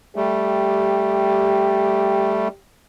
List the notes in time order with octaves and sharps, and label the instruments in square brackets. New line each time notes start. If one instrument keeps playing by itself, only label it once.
[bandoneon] G3 A3 [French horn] G4